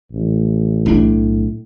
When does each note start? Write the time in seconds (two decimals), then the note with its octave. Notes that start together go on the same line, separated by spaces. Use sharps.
0.12 A1
0.86 B1 A2 D4